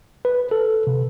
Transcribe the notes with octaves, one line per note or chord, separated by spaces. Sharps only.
B4
A4
C3